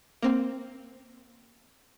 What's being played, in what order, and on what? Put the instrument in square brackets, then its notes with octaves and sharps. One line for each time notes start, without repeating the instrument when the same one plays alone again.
[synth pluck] A#3 C4